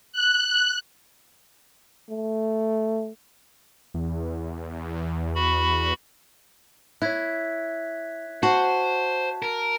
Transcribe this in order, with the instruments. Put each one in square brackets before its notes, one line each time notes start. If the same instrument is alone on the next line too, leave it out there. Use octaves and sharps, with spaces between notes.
[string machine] F#6
[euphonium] A3
[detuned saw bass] E2
[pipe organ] F#4 B5
[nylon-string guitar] E4 [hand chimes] C#5 E5 [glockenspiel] F#6 G#6 B6
[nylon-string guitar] F#4 [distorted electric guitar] C5 [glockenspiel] A5
[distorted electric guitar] A#4